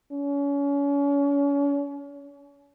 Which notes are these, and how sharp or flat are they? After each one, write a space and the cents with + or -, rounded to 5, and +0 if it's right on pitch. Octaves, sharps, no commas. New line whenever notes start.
C#4 +35